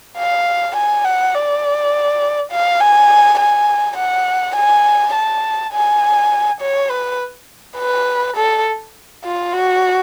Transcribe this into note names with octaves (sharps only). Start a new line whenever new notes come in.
F5
G#5
F#5
D5
F5
G#5
G#5
F#5
G#5
A5
G#5
C#5
B4
B4
A4
F4
F#4